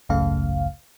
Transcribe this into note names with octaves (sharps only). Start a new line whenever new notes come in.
G#1 C#2 F#2 C#3 A3 F5